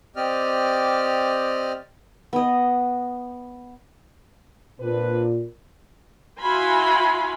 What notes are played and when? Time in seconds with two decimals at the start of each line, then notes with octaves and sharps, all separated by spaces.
0.16 C4 G4 D5 D#5 F6
2.33 B3 D#5
4.80 A#2 C4 D4 B4
6.40 E4 F#4 F5 G#5 B5 C6